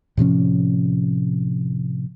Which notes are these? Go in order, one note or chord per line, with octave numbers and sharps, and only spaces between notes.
A2 C3 F3 C#4